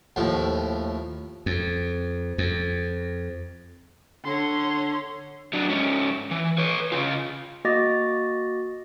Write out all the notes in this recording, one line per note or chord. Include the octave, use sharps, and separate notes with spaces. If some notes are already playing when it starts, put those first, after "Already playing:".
D#2 A2 F3
F2
F2
D3 C#5 C6
F#3 D4
G#2 C#4
E3
B4 C#5
C#3 F4
A#3 F#4 D#5 D6 A6 A#6